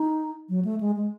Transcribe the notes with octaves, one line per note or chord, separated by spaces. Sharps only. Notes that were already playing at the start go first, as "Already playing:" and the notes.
Already playing: D#4
F#3
A3
G#3
G#3